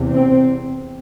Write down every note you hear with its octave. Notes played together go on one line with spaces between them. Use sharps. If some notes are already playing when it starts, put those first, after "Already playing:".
Already playing: E2 C3
C4